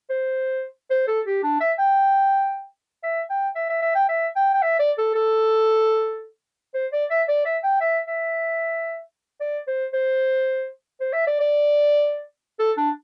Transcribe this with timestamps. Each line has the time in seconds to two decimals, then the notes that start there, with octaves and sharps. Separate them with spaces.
0.10 C5
0.90 C5
1.08 A4
1.26 G4
1.43 D4
1.60 E5
1.79 G5
3.03 E5
3.30 G5
3.55 E5
3.70 E5
3.82 E5
3.95 G5
4.09 E5
4.36 G5
4.54 G5
4.62 E5
4.79 D5
4.98 A4
5.15 A4
6.74 C5
6.93 D5
7.10 E5
7.29 D5
7.45 E5
7.63 G5
7.81 E5
8.07 E5
9.40 D5
9.67 C5
9.93 C5
11.01 C5
11.13 E5
11.27 D5
11.40 D5
12.59 A4
12.78 D4